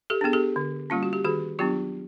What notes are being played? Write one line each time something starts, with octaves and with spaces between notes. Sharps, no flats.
G4 A4
B3 D4 G#4
G4 A4
D3
G3 A#3 C#4 F4
F#4
G4
D#3 F#4 G#4
F#3 B3 D4 F4 G4